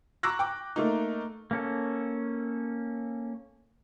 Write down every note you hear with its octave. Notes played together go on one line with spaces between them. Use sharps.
A#5 C#6 D6 E6 F#6 A#6
G5 D6
A3 A#3 D#4
A#3 C#4 A4